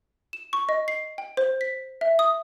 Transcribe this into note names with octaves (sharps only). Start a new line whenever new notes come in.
E7
C#6
D#5
C7
G5
C5
B6
E5
D#6